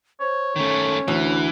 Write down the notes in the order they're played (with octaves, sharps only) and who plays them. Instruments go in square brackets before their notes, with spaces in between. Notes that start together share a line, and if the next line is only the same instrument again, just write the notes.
[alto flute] C5 [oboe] C#5
[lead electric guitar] D#3 A3 [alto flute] C#4
[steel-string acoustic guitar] D2 [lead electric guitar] E3